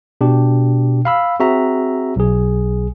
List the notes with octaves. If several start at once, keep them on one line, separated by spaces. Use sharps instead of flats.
B2 D4 G4
F5 B5 E6
C4 F#4 G#4 E5 A#5
B1 G#4